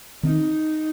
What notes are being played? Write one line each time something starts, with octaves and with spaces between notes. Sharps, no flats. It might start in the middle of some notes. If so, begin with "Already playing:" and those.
D#3 C4 D#4